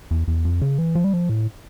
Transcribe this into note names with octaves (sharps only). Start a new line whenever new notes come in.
E2
E2
F2
C#3
E3
F3
G3
F3
A2